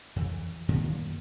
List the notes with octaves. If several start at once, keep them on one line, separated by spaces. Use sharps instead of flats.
F2 E3
F#2 A#2 D#3 G3